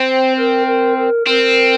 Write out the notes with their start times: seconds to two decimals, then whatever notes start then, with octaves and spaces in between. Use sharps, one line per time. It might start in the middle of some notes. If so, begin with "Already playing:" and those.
Already playing: C4 C5
0.38 A#4
0.67 A#4
0.98 A#4
1.27 C4 A#4